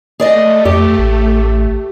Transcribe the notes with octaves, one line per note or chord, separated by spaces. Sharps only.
A3 G#4 D5 D#5
F2 G4
A1